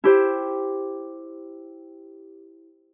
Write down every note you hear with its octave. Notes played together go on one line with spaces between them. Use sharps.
E4 G4 C5